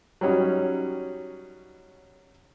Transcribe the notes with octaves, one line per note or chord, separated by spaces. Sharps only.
F#3 G3 C#4 D#4